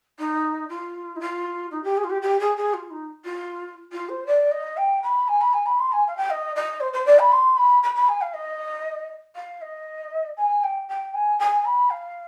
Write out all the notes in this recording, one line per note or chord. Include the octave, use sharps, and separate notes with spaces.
D#4
F4
D#4
F4
D#4
G4
G#4
F4
G4
G4
G#4
G#4
F4
D#4
F4
F4
C5
D5
D#5
G5
B5
G#5
B5
G#5
B5
C6
G#5
F5
G5
D#5
D#5
C5
C5
D5
B5
C6
B5
B5
B5
G#5
F5
D#5
F5
D#5
G#5
G5
G5
G#5
G#5
B5
F5